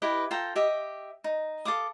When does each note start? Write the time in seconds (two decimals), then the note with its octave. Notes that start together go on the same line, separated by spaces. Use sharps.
0.02 E4 G4 B4 D#5
0.31 F4 A4 G5 A#5
0.56 G4 D#5 E5 D#6
1.24 D#4
1.65 A4 F5 D6 D#6